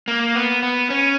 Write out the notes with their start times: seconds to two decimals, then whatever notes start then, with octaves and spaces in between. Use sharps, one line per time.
0.08 A#3
0.35 B3
0.63 B3
0.90 C#4